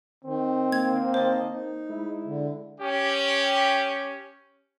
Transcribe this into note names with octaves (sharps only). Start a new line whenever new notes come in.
D#3 C4
A#3 G#6
D#3 C5 D#5 A5
D#4
G#3 E4
D3
C#4 G4